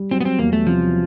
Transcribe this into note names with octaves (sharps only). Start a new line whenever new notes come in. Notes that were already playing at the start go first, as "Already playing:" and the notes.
Already playing: G3
F#3 C4
B3
C4
E2 A#3
A3
C3 F3